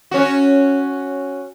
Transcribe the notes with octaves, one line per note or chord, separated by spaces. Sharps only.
C#4 F#4